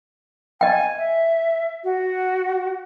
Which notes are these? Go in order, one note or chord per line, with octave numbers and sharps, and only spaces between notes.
D#5 G5 G#5
E5
F#4